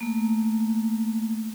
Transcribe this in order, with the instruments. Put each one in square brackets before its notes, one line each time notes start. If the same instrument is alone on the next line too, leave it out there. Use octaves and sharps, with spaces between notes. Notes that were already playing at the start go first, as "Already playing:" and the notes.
[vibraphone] A3 A#3